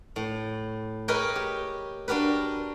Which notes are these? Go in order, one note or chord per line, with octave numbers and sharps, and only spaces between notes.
A2
G#4 A#4 B4 C#5 D#5 G5
G4
D4 F#4 G4 A#4 B4